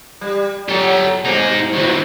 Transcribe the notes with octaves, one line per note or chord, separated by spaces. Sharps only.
G3
F#3 G4 A4
B2 D#4 G#4
G2 A#2 D#3 C4 E4